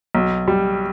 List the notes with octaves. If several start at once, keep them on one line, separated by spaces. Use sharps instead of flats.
B1
G3